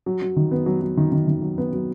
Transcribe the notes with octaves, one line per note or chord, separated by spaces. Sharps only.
F#3
F#3
D#3
B3
F#3
F#3
D#3
D#3
D#3
F#3
B3
F#3